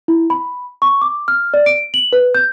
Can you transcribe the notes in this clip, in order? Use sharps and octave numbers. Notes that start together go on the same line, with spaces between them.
E4
B5
C#6
D6
F6
D5
D7
F#7
B4
G6